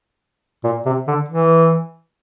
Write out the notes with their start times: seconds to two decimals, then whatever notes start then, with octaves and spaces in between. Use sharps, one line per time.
0.64 A#2
0.86 C3
1.07 D3
1.29 E3